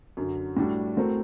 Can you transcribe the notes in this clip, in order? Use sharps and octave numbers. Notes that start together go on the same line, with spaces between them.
F#2 D3 F#3
A2 G3 D4 F#4
A2 A3 C4 F#4 A#4